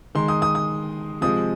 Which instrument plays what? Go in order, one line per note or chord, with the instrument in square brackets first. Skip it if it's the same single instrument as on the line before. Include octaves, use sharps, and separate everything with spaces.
[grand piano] D#3 G#3 C6
D#6
D#6
D#6
C3 F3 G#3 D#6